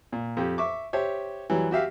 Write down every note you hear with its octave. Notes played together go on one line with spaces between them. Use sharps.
A#2
F2 G4
E5 C#6 D6
G4 C5 C#5 E5
E3 F#3 G3
F#4 G4 E5 F5